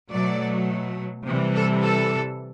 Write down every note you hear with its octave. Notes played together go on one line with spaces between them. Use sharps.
B2 F#3 A3 D5
C3 E3 G3
A4
A4